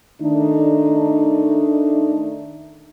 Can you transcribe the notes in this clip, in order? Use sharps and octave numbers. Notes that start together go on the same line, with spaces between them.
D#3 A3 D4 D#4